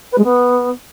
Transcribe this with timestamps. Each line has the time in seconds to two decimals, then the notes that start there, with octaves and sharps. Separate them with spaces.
0.11 B4
0.17 G#3
0.23 B3